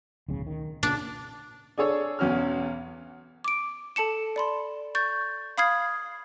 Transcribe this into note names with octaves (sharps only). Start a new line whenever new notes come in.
D1 B1 C#3
D#3
A#2 C#3 D4
D4 G#4 A4 C#5
B1 E2 C#4 F#4 F6
D6 D7
A4 A5 C#7 E7
D5 B5 C6
C#6 G6 A6
F5 B5 D#6 F6 G#6 C7